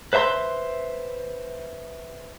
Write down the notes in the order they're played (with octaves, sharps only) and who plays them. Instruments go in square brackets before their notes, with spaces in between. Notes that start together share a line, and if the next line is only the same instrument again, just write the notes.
[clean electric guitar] B4 C5 E5 A#5 C6